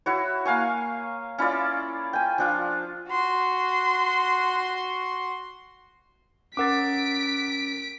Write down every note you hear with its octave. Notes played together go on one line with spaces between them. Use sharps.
E4 F#4 C#5
A#3 F5 G#5 C#6
C#4 E4 F4 D5
G5 G#5
F3 D4 F4
F#4 C6
C#4 A#4 F#5 D6 A6 B6 D7